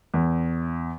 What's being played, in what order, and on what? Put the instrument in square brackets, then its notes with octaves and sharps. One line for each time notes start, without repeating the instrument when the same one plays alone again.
[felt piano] E2